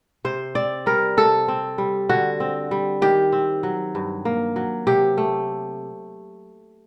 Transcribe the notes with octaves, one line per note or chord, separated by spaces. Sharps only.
C3 C5
C4 D5
G3 A#4
C3 A4
C4
G3
D3 F#4
C4
G3
D#3 G4
C4
F#3
G2
A#3
F#3
C3 G4
A3